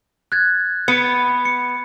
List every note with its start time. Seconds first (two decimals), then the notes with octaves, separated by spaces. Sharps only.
0.32 F#6 G#6 A6
0.88 B3 C#7
1.45 C#7